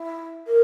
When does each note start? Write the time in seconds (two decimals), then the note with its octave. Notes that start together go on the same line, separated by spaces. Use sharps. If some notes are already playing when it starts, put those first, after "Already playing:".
Already playing: E4
0.47 A#4